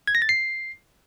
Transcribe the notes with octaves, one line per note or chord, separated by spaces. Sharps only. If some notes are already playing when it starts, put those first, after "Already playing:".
G#6
A#6
A6
C7